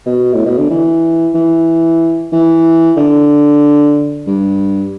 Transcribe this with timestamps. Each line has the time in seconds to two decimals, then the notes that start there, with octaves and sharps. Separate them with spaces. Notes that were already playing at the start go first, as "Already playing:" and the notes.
0.06 B2
0.34 A2
0.46 B2
0.58 D3
0.70 E3
1.35 E3
2.32 E3
2.97 D3
4.27 G2